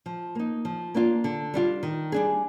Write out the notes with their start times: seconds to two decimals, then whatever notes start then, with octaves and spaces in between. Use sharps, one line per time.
0.06 F3
0.35 A#3 D#4
0.65 F3
0.94 A#3 D4 F4
1.24 D3
1.54 G3 D4 F4
1.83 D#3
2.12 G3 D4 G#4